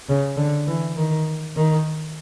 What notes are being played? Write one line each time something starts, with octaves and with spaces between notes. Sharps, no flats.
C#3
D3
E3
D#3
D#3